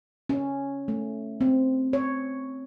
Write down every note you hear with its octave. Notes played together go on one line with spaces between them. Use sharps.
C#4
A3
C4
C#5